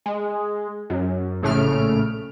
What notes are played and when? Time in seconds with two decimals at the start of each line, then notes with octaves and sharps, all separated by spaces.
0.06 G#3
0.90 F#2
1.42 A#1 A2 C#3 A3 F6 D7